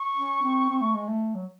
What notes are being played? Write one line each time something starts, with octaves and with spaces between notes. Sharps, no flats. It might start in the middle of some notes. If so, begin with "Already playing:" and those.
Already playing: C#6
C#4
C4
C4
A3
G#3
A3
F#3